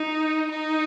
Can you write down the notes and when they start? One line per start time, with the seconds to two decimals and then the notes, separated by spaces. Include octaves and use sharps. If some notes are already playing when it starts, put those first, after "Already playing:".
Already playing: D#4
0.51 D#4